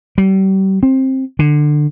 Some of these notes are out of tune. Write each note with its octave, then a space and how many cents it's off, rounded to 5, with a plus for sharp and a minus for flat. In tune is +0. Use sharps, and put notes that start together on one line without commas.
G3 -35
C4 +15
D3 +20